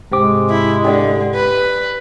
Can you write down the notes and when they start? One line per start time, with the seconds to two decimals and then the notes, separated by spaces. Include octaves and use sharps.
0.12 C2 G#2 C3 G#3 C4 G4 D6
0.50 E4
0.85 D3 G4 D5
1.35 B4